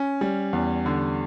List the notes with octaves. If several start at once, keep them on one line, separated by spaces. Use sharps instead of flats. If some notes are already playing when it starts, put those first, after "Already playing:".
Already playing: C#4
G3
E2
D3